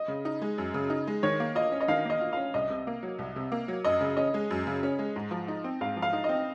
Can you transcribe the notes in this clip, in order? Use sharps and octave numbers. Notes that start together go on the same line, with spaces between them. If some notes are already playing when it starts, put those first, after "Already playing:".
Already playing: D#5
C#3
D#4
G#3
F#2
C#3
D#4
G#3
D#3 C#5
A#3
F4 D#5
C#4
D#5
D#3 F5
A#3 D#5
F4
C#4 F5
C2 D#5
C3
A#3
F#3
C2
C3
A#3
F#3
F#2 D#5
C#3
C#4 D#5
G#3
F#2
C#3
C#4
G#3
G#2
F3
D#4
C4
G#2 F5
F3
F5
D#4
D#5
C4